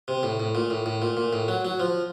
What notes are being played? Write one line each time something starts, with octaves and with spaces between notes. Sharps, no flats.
C3
A2
A2
A#2
A2
A2
A#2
A#2
A2
F#3
F#3
F3